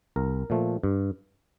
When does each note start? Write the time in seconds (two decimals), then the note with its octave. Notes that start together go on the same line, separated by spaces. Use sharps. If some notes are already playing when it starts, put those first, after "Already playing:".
0.16 C2 A#4
0.50 A#2 F3 A3
0.84 G2